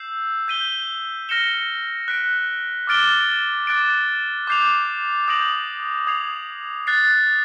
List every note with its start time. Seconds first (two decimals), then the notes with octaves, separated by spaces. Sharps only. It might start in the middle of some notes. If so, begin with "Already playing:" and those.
Already playing: E6 G6 C7 E7
0.48 G6 B6 D#7 G7
1.29 F6 A#6 C#7 E7 G7
2.08 F#6 B6 D7
2.87 D6 F6 A6 D7 G7
3.67 D6 F#6 A6 D7
4.47 D6 G6 C7 F7
5.28 D#6 G6 A#6 D7 F#7
6.07 D#6 G#6 C7 F7
6.87 F#6 A6 C7